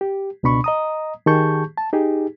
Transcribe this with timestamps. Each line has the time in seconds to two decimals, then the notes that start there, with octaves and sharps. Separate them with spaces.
0.01 G4
0.43 C#2 B2 D4 B5 C#6
0.64 D#5 A#5 D#6
1.26 D#3 G4 G#4 A5 C#6 G6
1.78 A5
1.93 D#4 G4 G#4